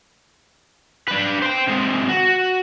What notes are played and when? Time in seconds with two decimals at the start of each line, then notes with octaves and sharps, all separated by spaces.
1.08 D4 B4
1.42 C5 G5
1.68 C3 G#3
2.09 F#4